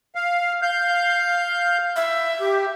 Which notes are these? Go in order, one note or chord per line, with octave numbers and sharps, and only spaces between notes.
F5
F5 G6
E5
G4